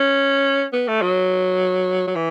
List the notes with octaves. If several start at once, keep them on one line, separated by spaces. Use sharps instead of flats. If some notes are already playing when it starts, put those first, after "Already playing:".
Already playing: C#4
B3
A3
F#3
F#3
E3